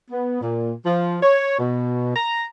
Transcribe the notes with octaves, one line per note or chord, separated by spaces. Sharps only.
B3
A#2
F3
C#5
B2
A#5